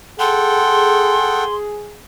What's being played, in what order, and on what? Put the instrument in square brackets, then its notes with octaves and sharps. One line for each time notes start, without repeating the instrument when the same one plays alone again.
[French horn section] G#4 [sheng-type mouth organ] A4 F#5 G5 [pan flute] C6